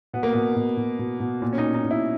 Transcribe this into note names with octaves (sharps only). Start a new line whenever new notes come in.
B2 B3
A#3
B2 B3
B2
B2
B2
B2
A#2
C#4
D#4
A#2
D#4
A#2
E4